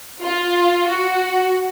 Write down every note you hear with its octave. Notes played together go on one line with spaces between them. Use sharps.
F4
F#4